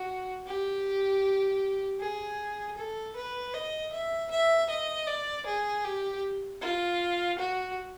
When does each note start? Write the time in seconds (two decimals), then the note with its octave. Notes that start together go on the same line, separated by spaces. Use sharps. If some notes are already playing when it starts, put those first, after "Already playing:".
Already playing: F#4
0.47 G4
2.00 G#4
2.77 A4
3.16 B4
3.54 D#5
3.92 E5
4.31 E5
4.69 D#5
5.07 D5
5.46 G#4
5.84 G4
6.62 F4
7.38 F#4